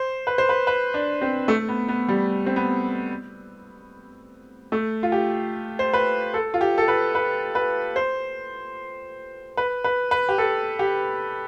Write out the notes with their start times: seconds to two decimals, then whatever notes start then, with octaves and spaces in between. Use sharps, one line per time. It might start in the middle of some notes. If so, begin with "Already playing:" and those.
Already playing: C5
0.27 B4
0.38 C5
0.49 B4
0.67 B4
0.94 D4
1.21 C4
1.48 A3
1.68 B3
1.88 B3
2.09 G3
2.46 C4
2.56 B3
4.72 A3
5.03 F4
5.12 G4
5.79 C5
5.94 B4
6.34 A4
6.54 F4
6.61 G4
6.78 A4
6.88 B4
7.15 B4
7.55 B4
7.96 C5
9.57 B4
9.84 B4
10.11 B4
10.29 G4
10.38 A4
10.79 G4